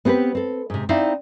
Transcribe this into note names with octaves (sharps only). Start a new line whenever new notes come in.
B3 C4 G4 A#4 B4
C4 A4
G#2 C3
C4 D#4 E4 D5 F5